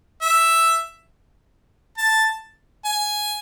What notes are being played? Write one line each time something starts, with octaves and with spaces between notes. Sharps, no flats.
E5
A5
G#5